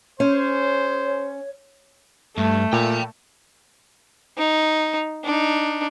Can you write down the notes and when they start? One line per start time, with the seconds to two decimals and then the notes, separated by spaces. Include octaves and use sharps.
0.20 C#4 G#4 C5 C#5
2.38 G2 A3
2.73 A#2 G5 B5
4.38 D#4
5.24 D4 D#4